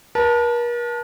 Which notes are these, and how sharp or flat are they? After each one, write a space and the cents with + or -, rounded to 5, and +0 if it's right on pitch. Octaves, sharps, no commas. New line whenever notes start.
A#4 +45 A5 +0